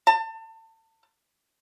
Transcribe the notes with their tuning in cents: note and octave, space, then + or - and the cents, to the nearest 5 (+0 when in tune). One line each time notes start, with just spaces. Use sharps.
A5 +30